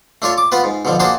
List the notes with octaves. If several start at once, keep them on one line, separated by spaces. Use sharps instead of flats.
A3 D4 F4 C#5
D6
B3 F4 B4
G#2
B2 D3 F3
A#3 D4 F#4 G#4 C5 A5